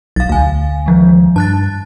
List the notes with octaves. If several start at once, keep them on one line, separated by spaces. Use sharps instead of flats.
B1 F5 A6
D2 F5 G#5
D#3 F3 G#3
G2 A5 F#6 A6